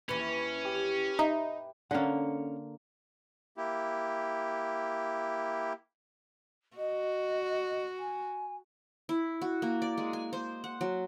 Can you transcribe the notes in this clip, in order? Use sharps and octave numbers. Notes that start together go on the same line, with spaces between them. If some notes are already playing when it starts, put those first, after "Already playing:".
D#2 E3 C#4 B4
G4
D#4 E5
D3 A#3 C#4 A4 F#5
A#3 E4 G4
F#4 D#5
G#5
E4
F#4
A#3
D5
G#3
G#5
C5
F#5
F#3